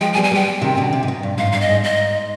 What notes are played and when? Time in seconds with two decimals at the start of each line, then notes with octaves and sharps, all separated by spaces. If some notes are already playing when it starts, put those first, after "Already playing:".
0.01 F3 G#3 G5
0.13 G#5
0.16 G3 B3
0.24 G#5
0.31 G3 B3 G5
0.62 C3 D#3
0.77 B2 D3
0.93 C3
1.03 G#2
1.08 B2
1.23 G2
1.38 G#2 F5
1.52 G2 F5
1.61 D#5
1.69 G#2
1.84 G#2 D#5